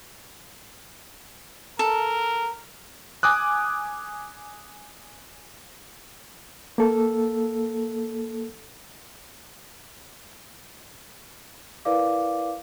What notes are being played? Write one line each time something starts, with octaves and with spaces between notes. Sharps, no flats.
A4 A#4
G#5 D6 D#6 F#6
A#3 A4
E4 A#4 B4 D5 F5 D6